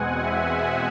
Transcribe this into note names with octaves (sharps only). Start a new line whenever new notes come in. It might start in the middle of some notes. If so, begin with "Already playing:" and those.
Already playing: E2 B2 G#3 C4 F#5 G#5
E5 F#5